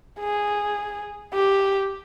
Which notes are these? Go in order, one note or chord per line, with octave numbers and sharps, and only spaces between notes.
G#4
G4